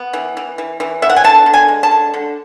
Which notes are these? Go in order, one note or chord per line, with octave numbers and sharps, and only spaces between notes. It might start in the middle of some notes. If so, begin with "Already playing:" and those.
Already playing: B3
E3
E3
E3
E3
B3 E5
F#5
G#5
D3 A5
D3
G#5
G#3
A5
D3
D3